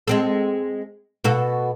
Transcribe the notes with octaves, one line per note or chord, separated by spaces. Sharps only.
G#3 C4 A4
B2 F#4 A4